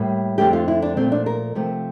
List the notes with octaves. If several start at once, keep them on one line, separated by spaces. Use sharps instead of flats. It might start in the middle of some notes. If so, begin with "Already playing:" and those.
Already playing: A2 G3 A#3
F2 D3 A3 G4
F4
E4
D4
A#2 F3 A3 C4
D4
A#4
C3 F3 A3